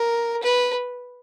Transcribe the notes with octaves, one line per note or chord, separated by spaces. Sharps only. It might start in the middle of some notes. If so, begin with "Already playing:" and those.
Already playing: A#4
B4